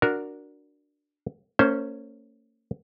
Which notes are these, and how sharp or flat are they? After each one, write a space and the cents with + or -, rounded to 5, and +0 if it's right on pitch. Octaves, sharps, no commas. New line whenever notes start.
D4 +0 F#4 -10 A#4 +0
A#3 -40 C#4 +0 C5 +0